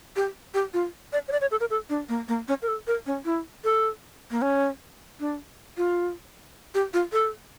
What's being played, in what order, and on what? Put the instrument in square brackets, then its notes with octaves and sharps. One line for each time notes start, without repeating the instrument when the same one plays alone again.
[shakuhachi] G4
G4
F4
D5
C#5
D5
C#5
A4
A#4
A4
D4
A#3
A#3
C#4
A#4
A4
A#4
C#4
E4
A4
A#3
C#4
D4
F4
G4
F4
A4